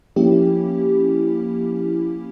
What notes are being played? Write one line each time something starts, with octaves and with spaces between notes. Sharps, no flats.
F3 A#3 C#4 E4 G4